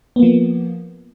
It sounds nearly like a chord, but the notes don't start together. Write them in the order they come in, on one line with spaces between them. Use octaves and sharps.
B3 A#3 F3